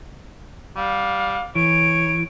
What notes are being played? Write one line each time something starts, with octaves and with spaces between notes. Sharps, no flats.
G3 F5
E3 C#5 D7